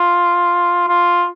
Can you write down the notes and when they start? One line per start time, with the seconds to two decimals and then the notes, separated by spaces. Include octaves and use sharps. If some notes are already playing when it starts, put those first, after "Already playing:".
Already playing: F4
0.88 F4